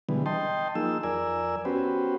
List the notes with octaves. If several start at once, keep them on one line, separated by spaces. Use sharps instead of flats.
B2 D3 E3 G3 G#3 B3
D#5 G5 A5 C6
F3 A#3 D#4 G#4 E6
F2 A#4 D5 G#5 E6
B3 C#4 F#4 G4 B4 C5